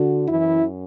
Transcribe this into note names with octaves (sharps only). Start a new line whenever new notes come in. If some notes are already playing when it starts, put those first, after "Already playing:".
Already playing: D3 F#4
F#2 E3 E4